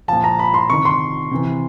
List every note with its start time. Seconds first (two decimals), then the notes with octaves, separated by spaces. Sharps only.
0.08 A#2 F3 A5
0.24 A#5
0.39 B5
0.54 C6
0.70 C3 D#3 C#6
0.85 C6
1.31 C3 E3